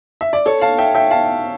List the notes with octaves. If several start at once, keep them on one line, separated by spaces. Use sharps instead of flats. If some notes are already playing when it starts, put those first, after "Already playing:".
E5
D5
A4 C#5
F5 A5
E5 G5
E5 G5
F5 A5